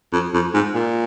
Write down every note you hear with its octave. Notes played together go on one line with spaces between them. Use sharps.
F2
F2
G#2
A#2